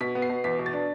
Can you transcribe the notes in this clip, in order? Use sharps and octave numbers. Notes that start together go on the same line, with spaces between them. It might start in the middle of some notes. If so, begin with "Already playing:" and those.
B2 B6
B3
C7
B2
E2 B6
B2
A6
D4